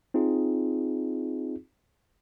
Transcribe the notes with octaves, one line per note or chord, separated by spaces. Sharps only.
C4 D#4 F4 G#4